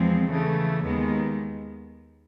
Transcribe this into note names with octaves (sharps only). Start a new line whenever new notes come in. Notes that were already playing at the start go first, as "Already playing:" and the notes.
Already playing: E2 F3 G#3 C4
C#3 E3 A3
D#2 D#3 G#3 B3